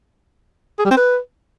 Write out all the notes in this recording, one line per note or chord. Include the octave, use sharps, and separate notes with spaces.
G#4
G3
C4
B4